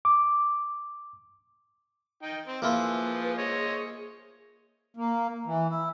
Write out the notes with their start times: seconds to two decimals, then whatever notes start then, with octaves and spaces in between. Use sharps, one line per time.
0.05 D6
2.22 D#4 G5
2.48 C4
2.62 F3 A#3 E4 F4 G#4 B4
3.38 G#4 C5 C#5 D#5
4.97 A#3
5.46 E3
5.70 E4